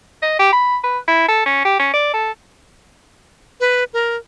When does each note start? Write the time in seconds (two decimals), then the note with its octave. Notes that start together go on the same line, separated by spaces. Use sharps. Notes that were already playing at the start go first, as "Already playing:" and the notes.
0.23 D#5
0.39 G4
0.53 B5
0.83 B4
1.07 E4
1.28 A4
1.46 C#4
1.65 G4
1.79 C#4
1.94 D5
2.14 A4
3.60 B4
3.93 A#4